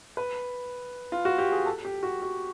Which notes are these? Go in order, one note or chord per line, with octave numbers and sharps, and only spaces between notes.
B4
F4
F#4
G4
G#4
A4
G4
F#4
F#4